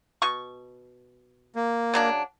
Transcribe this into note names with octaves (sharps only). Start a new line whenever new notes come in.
B2 C#6
A#3
C#3 F#3 D4